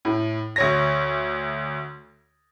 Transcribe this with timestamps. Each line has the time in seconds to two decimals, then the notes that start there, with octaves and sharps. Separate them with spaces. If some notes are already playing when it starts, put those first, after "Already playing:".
0.05 A2
0.56 D2 C#5 A#6